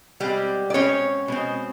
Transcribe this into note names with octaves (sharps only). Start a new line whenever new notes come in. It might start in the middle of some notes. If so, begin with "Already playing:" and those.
B2 G3 G#3 C4 G4
D5
B2 G#3 C4 C#4 C#5
B2 G#3 C4